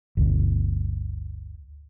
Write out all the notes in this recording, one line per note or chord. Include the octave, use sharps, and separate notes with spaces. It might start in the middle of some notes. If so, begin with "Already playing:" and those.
G1 D2